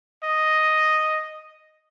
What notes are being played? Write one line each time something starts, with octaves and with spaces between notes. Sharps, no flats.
D#5